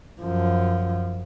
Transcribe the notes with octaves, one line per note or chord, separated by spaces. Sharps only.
F#2 F3